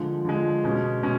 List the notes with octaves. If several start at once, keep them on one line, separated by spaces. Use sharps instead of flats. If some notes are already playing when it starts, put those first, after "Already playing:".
Already playing: D3 F3 G#3
D3 F3 G#3
B2 G#3 C#4
B2 G#3 C#4